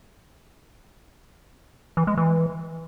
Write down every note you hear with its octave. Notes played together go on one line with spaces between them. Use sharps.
E3
G#3
E3